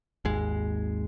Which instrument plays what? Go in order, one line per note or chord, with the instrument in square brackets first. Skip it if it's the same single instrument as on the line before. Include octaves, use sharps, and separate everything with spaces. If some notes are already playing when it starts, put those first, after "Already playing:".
[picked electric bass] G#1 D#2 G#3